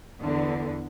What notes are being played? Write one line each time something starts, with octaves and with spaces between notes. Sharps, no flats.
E2 D3